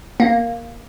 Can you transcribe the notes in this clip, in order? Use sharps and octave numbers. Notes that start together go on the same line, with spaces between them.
A#3